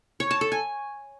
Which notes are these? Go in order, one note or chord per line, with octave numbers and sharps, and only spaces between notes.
C#5
A5
A4
G#5